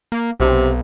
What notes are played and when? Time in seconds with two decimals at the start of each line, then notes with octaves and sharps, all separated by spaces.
0.12 A#3
0.40 B1 C3